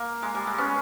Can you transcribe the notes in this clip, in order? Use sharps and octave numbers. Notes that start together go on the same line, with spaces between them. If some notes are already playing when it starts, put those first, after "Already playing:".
Already playing: A#3
G#3
G3
G#3
B3 C#4